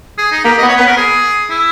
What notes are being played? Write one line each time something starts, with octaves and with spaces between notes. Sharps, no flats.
G#4
D#4
A#3 G4
B3 D#5
C#5
B3 B4
A#4
G#4
E4